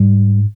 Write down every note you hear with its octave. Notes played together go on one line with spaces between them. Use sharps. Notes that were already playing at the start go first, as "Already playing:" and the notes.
Already playing: G#2 G3